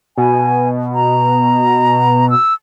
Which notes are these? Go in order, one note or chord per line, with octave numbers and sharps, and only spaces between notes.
B2 G#5
A#5
E6